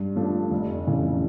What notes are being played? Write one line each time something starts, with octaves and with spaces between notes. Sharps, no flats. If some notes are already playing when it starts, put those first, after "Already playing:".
Already playing: G2
F3 A3 D4
F1
F2 C#3 E3 A3